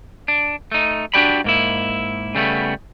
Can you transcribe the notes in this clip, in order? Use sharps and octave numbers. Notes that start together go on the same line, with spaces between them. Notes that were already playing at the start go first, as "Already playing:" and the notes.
D4
A3 D#4
D4 D#4 F#4 G4 D5 B5
G#2 A#3 E4
C#3 G3 A3 B3